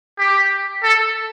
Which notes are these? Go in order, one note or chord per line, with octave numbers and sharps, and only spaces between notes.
G4
A4